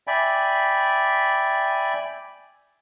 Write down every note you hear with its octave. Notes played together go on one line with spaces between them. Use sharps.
D5 E5 G5 G#5 B5